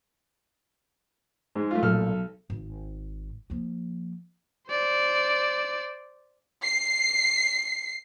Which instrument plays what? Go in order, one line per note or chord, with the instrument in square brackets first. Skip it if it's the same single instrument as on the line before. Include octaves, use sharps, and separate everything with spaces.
[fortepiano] G#2 [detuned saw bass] G#3
[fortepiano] A3 F4
[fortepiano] B1 A4 F6 [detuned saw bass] A#2
[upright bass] G#1
F3 A#3
[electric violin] C5 D5
[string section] C7